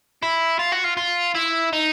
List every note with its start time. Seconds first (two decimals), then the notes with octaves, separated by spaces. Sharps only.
0.23 E4
0.59 F4
0.72 F#4
0.84 F4
0.97 F4
1.35 E4
1.73 D#4